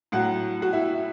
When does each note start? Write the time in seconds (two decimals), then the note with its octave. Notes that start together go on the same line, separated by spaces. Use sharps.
0.12 A2 F#3 F#5
0.62 F#4
0.73 E4